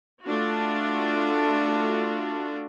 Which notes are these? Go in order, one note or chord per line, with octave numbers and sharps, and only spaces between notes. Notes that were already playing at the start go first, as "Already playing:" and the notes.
A3 D4 F4 F#4